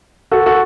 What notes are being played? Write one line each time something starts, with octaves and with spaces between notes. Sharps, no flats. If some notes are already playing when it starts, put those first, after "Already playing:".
F#4 A4
F#4 A4